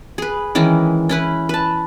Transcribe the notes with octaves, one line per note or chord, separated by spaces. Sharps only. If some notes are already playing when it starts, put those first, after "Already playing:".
G#4 B4
D#3 E3 G#3 C#4
C#4 E4 B4
B4 A5